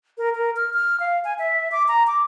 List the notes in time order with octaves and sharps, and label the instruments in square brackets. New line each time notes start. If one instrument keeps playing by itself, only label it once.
[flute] A#4
A#4
F6
F6
F5
G#5
E5
D6
A#5
D6